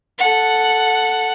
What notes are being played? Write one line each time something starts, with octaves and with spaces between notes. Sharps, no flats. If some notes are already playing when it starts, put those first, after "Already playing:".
A4 F#5